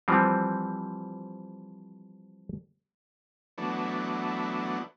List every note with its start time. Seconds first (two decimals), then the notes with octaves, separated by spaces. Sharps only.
0.08 E3 F3 G3 C4
3.58 E3 F#3 A3 B3 D4